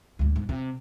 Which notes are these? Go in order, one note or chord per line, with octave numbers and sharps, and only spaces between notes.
D2 G#2
G#2
C3